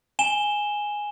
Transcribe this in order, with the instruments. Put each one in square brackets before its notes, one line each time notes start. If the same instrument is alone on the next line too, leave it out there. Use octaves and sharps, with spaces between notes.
[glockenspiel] G#5 E7 G7